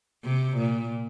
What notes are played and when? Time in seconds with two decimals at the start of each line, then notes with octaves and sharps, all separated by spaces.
0.25 C3
0.57 A#2